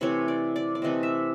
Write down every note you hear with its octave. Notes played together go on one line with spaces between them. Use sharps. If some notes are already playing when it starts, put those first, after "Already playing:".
C3 E3 A3 C4 C#5
D5
D5
D5
C3 E3 A3 C4 D#5
E5